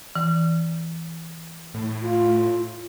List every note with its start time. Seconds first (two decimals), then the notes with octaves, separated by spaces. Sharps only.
0.15 E3
1.74 A2
2.02 F4